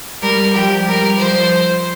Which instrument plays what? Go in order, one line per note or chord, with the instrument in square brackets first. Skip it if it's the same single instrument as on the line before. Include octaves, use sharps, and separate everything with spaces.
[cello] G3 [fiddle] A#4
[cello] F3 [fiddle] G4
[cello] G3 [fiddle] A#4
[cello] F3 [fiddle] C5